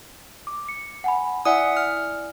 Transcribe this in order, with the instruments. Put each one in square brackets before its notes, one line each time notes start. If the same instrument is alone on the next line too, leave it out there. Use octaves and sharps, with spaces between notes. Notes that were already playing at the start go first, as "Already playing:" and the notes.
[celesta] D6
C#7
F#5 G#5 B5
[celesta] E4 D5 G#5 [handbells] E5 F#5 D#6
[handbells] F6